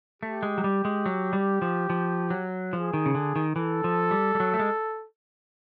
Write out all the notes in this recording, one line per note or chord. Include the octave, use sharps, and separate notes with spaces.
A3 G4
G#3
F#3
G3
G#3
F#3
G3
F3
F3
F#3
F3 G#4
D#3
C#3
D3
D#3
E3 A4
F3
G3
G3
F#3
A3
G#3